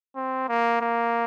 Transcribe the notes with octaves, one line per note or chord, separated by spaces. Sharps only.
C4
A#3
A#3